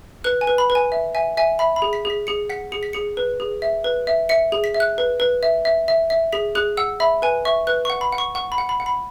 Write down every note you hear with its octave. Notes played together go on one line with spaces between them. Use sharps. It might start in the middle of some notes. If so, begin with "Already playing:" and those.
B4 F#6
G#5
B4
B5
B4
G#5
E5
E5 G#5
E5 G#5
E5 B5
B5
G#4
B6
G#4 B6
G#4 C#7
F#5 B6
G#4 C#7
B6
G#4 C#7
B4
G#4
E5
B4
E5
E5 C#7
G#4
B6
E5
F#6
B4
B4
E5
E5
E5
E5
G#4 B6
G#4 F#6
F#5 E6
E5 B5
B4 G#5
E5 C#6
B4 F#6
C#6
F#5
B5
F#5
C#6
F#5 C#6
B5
F#5
B5
F#5
B5